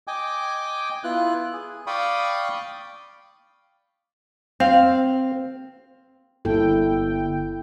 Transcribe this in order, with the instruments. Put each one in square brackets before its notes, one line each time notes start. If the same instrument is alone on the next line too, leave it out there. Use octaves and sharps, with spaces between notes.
[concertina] D#5 G5 G#5 D6
B3 E4 F4 F#6
G#4
D5 F5 G5 B5 C#6 D#6
[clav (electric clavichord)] C4 [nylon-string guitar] F5
[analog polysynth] G1 G5 [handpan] A#3 E4 A4